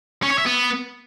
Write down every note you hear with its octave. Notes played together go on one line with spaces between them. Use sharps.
C#4
C#5
E5
B3